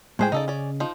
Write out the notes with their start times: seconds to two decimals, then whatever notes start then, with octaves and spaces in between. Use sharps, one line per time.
0.19 A2 F3 G#3 C5 G5 G#5
0.32 C#3 D#4 A4 D5 D#5
0.48 C#4 D5
0.80 F3 D#4